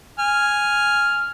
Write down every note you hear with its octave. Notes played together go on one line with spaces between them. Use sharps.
G#5 F6